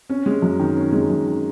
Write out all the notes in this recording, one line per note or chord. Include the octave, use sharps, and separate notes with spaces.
C#4
G#3
F#2
D#3
C#4
G#3
F#2
D#3